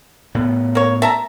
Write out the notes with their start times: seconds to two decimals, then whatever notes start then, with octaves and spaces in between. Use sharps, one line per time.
0.35 A2 B3
0.75 A#3 C#5
1.02 E5 A5 A#5